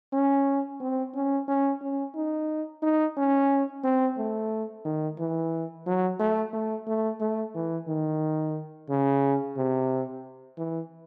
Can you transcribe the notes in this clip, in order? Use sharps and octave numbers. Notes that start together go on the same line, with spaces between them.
C#4
C4
C#4
C#4
C#4
D#4
D#4
C#4
C4
A3
D#3
E3
F#3
A3
A3
A3
A3
E3
D#3
C#3
C3
E3